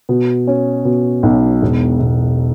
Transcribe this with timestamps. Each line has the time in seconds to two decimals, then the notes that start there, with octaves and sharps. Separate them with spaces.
0.09 B2
0.47 C#4
0.85 B2
1.23 B1
1.62 E1
2.00 E1